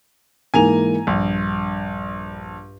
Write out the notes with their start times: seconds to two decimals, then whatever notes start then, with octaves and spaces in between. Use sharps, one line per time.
0.54 G#2 E3 A#3 G#5 A#5 F7
1.07 A#1 G2